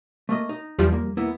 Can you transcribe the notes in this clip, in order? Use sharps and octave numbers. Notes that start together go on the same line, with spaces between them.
A3 A#3 D#5
D#4
E2 F3 G3
A#3
A#3 B3 E4